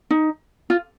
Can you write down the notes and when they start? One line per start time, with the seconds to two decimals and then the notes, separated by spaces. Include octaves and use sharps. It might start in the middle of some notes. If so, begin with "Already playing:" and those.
0.11 D#4
0.70 F4